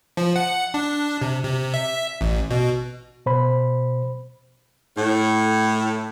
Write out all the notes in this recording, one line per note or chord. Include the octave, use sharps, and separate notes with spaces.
F3
F#5
D4
C3
C3
E5
A1
B2
B2 C5 B5
A2